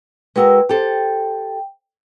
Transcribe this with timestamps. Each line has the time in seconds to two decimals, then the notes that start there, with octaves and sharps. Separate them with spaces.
0.36 G#3 F#4 A#4 B4 G5 E6
0.69 G4 A4 C5 G5